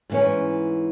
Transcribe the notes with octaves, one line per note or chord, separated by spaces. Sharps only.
G#2 E3 C#4